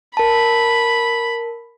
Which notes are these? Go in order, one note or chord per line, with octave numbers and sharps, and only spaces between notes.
A#4 A5 B5